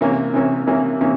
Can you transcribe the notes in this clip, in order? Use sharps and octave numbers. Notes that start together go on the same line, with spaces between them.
C3 E3 A#3 C#4
C3 E3 A#3 C#4
C3 E3 A#3 C#4
C3 E3 A#3 C#4